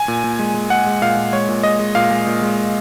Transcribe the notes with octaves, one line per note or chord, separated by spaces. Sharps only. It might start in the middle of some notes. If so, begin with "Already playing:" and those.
Already playing: G#5
A#2
A#2
G#3
G#3
G#3 F#5
G#3
A#2 F5
A#2
G#3 C#5
A#2
G#3 D#5
G#3
A#2 F5
G#3
A#2
G#3